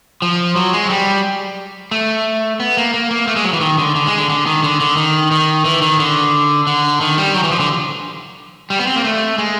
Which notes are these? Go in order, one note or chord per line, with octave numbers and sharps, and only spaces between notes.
F3
F#3
G#3
F#3
G3
A3
B3
A#3
A#3
A#3
A3
G#3
F#3
E3
D#3
D3
D3
G#3
D3
D3
D#3
D3
D3
D#3
D#3
E3
D#3
D3
D3
D#3
G3
F#3
E3
F3
D3
G3
B3
C4
A#3
A3
G#3